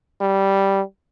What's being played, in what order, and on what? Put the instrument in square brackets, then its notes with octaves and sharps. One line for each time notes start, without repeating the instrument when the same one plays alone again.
[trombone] G3